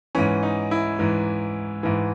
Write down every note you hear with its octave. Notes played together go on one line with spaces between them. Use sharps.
G#2 E3 C#4
D#4
E4
G#2 E3
G#2 E3